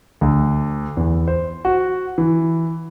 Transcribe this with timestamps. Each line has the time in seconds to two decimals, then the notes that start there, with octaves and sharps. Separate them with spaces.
0.21 D2
0.97 E2
1.28 C5
1.65 F#4
2.18 E3